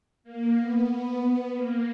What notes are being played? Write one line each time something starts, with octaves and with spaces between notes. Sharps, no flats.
A#3
B3
B3
A#3